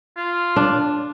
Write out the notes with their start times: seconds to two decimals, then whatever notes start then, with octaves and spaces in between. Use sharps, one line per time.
0.17 F4
0.56 D4